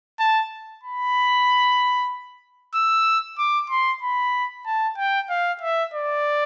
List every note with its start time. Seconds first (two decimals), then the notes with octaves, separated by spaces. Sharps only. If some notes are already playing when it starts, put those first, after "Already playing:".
0.19 A5
0.84 B5
2.74 E6
3.39 D6
3.70 C6
4.02 B5
4.66 A5
4.98 G5
5.30 F5
5.62 E5
5.94 D5